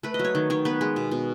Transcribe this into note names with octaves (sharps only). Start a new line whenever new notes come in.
A3 B4
D#5
F#3
C#5
D#3
D#3 C#5
B3 B4
G#3
B2
B2